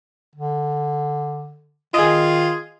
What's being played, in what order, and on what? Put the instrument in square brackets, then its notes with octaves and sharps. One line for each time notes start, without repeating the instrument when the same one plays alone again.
[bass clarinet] D3
[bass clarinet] D#3 [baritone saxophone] F4 [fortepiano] G#4 D#5